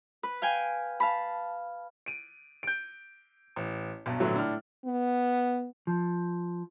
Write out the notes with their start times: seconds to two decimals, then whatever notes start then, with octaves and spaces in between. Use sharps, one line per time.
0.23 B4
0.42 F5 G5 G#5
1.00 F5 A5 B5
2.06 D7 D#7
2.63 G6 D7
3.56 A1
4.06 B1 G2
4.20 A#1 A2 D3 E3 F#3
4.36 A2 D4 F6
4.85 B3
5.87 F3